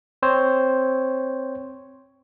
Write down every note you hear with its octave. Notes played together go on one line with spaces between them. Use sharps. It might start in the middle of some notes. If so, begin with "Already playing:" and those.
C4 C5 C#5